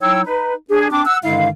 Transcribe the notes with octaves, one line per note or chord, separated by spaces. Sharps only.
F#3 D#4 E4 C#5 G5 E6
D#4 B4
D4 G4 G#4
C4 D4 D6
F#5 E6
G2 D3 D#3 G#3 E4 F5